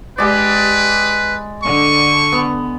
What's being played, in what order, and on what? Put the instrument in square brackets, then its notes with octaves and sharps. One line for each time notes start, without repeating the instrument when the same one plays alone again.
[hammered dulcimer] G#3 D5 [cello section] G4 [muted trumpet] B4
[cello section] D3 [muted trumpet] C#6
[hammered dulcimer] B3